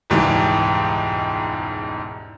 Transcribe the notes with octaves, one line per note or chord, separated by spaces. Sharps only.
E1 C#2 G#2 E3 G3 G4